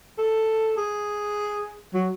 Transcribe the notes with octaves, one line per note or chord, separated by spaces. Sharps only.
A4
G#4
F#3